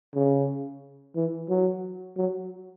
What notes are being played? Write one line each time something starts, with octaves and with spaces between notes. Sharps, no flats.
C#3
E3
F#3
F#3